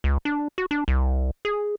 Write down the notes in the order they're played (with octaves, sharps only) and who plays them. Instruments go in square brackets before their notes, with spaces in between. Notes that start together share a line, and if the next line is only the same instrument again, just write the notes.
[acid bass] C#2
D4
F#4
D4
C2
G#4